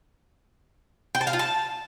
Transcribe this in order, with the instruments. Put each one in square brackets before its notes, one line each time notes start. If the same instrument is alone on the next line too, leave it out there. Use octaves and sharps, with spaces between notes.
[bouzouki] G5
A5
F5
F4
A5